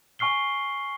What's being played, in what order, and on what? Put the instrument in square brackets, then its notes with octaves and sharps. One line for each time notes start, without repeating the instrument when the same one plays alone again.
[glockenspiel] G#5 C#6 F6 C7 G7